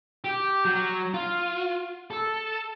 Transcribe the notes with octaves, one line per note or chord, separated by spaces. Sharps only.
G4
F#3
F4
A4